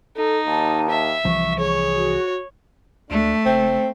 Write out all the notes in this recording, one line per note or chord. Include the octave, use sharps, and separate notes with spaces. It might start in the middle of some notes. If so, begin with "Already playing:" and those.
D#4 A4
D#2 A5
E5
C2 E3 F3 C#6
G#4 C#5
F#4
D2 A3 D4
F#1 C4